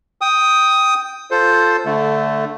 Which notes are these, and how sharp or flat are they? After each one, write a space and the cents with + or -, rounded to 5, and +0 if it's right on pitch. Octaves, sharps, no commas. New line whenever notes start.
G5 +0 D#6 +10
F4 +0 A4 +0 C5 +0
D3 -10 A3 +0